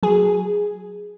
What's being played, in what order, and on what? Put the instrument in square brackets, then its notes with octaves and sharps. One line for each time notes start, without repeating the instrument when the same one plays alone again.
[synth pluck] F#3 G#4